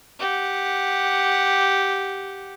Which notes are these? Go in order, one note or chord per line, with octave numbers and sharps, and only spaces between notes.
G4 F#5